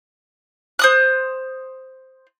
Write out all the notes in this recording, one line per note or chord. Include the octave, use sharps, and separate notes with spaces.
C5 D#6 F#6